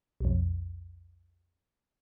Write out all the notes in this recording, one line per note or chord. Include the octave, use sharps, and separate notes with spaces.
B1 F2